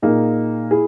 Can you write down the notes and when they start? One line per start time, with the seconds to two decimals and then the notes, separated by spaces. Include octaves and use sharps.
0.02 A#2 A#3 D#4 G#4
0.71 E4 G#4